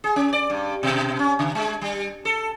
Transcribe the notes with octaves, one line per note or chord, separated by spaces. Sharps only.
G#4
C#4
D5
G2
B2
C#4
C#3
G#3
G3
A4